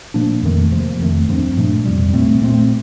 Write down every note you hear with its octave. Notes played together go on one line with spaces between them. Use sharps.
A#2 F3 A#3 D4
F2 D#3 A3
C3 F3 A#3
F2 D#3 A3
G2 F3 C4
A#2 F3 A3 D4
F2 C3 G3
A#2 A3 C4
A#2 A3 C4